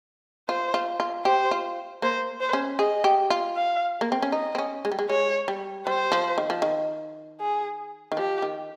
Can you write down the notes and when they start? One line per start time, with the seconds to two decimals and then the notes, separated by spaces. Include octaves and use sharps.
0.49 F4 C5
0.74 F4
1.00 F4
1.25 G4 C5
1.51 F4
2.02 A#3 C5
2.41 C5
2.53 C#4
2.79 G#4 D#5
3.04 G4
3.30 F4
3.56 F5
4.01 A#3
4.12 C4
4.22 C#4
4.32 D#4 D#5
4.55 C4
4.58 C#4
4.85 G#3
4.92 G3
4.99 G#3
5.10 G#3 C#5
5.48 G3
5.86 G3 C5
6.12 F3
6.38 D#3
6.50 F3
6.62 D#3
7.41 G#4
8.12 D#3
8.17 F3 G4
8.42 D#3